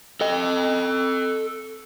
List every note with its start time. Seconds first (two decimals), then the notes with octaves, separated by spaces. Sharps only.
0.21 A4 D#5